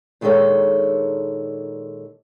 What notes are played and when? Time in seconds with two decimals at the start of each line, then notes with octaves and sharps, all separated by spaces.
0.21 A#2 D#3 G#3 D4 A4 C#5